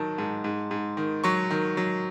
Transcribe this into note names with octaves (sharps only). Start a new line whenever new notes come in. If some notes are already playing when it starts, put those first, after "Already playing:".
Already playing: D#3 F#3 A5
G#2
G#2
G#2
D#3
F#3 C#6
D#3
F#3